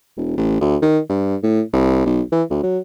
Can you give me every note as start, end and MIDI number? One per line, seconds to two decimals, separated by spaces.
0.17 0.33 28
0.37 0.57 33
0.61 0.76 38
0.82 0.99 51
1.09 1.35 43
1.42 1.62 45
1.73 2.04 36
2.05 2.21 35
2.32 2.43 52
2.50 2.59 38
2.63 2.79 54